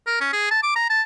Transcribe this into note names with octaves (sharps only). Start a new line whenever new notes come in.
A#4
C#4
G#4
A5
D6
A#5
A5